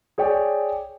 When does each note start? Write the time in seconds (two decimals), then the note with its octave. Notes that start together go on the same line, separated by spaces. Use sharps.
0.18 G#4 C#5 D5 G5